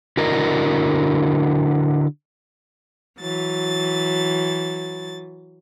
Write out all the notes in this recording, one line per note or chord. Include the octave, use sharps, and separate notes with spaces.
D3 E4 F#4 A#4 D5 D#5
E3 F#3 A6